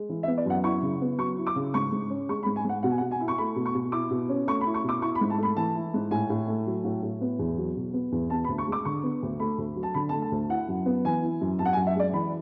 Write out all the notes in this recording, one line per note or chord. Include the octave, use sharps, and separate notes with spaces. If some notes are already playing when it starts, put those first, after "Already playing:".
Already playing: G#3
E3
E5
B3
D5
F#2 F#5
E4 C#6
C#3
B3
F#3 C#6
E4
D6
C#3
G#2 C#6
G#2
C#4
G#3 C#6
B5
G#2
G#5
G#2 F#5
B2 F#5
G#5
F#5
B2
G#5
E4
C#6
A3 B5
B2
C#6
B2
E4 D6
B2
C#4
A3 C#6
B5
E4
C#6
B2 D6
E4 C#6
B5
G#2
A5
A3 B5
E3 A5
E4
G#2
A2 G#5
A2
A3
F#3
A2
A2
B3
E2
F#3
B2
B3
E2
B3 A5
B5
D2
C#6
G#3 D6
D3 C#6
B3
D2
A3 B5
D2
F#3
A5
D3 B5
A5
A3
A5
D2
E4 F#5
F#2
B3
E3 G#5
E4
F#2
F#2 A5
F#5
G#5
F#2
E5
G#3 D5
E3 B5